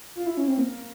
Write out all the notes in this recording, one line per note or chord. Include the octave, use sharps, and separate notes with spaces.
F4
E4
C#4
C4
A#3